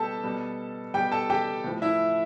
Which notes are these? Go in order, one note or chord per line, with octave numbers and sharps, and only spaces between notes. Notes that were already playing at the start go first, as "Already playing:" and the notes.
Already playing: B2 G3 G4 A4 A5
B2 G3
B2 G3 G4 G5
A4 A5
G4 G5
A2 F3
E4 E5